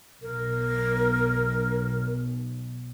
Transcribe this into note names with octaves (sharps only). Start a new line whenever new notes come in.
B1 A#4